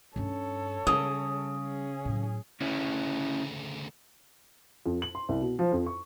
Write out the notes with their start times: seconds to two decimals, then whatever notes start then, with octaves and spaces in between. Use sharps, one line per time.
0.16 G2 C#4 A4 C#5
0.87 C#3 G3 D#6
1.56 C#4 G#4
2.05 A2 F#3
2.61 D2 C#3 C#4 E4
4.86 F2
5.02 F#7
5.15 C6
5.29 C2
5.41 B2
5.59 F3
5.72 F2
5.86 C#6